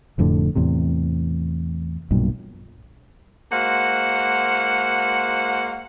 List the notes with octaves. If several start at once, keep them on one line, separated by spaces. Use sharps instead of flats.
F1 F2 A2 D3
E2 A2 C3
B1 G2 A#2
G#3 A#3 F#4 C5 F5 F#5